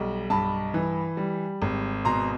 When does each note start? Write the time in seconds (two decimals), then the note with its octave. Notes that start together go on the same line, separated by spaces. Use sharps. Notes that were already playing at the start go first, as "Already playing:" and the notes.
Already playing: B1 G3
0.30 G2 A5 B5
0.74 E3
1.17 G3
1.62 G#1
2.05 B2 A#5 C6